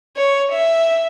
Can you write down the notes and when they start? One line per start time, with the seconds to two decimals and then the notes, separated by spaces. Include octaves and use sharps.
0.16 C#5
0.52 E5